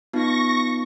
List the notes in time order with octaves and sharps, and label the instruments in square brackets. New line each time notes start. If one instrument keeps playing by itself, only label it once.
[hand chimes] B3 D#4 F4 [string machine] C#6 A#6